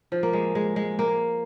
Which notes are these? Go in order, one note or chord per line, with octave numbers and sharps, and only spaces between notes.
F3
A#3
G#3
G#3
G#3
A#3